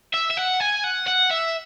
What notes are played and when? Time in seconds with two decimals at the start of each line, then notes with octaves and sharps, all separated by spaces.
0.14 E5
0.30 E5
0.37 F#5
0.60 G#5
0.84 F#5
1.08 F#5
1.31 E5